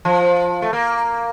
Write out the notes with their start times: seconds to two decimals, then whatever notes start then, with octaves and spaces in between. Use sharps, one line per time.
0.05 F3
0.62 A3
0.73 A#3